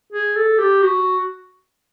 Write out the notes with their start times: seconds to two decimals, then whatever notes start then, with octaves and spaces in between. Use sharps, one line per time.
0.13 G#4
0.36 A4
0.58 G4
0.82 F#4